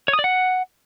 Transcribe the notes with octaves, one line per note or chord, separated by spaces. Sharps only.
C#5
D#6
D5
F#5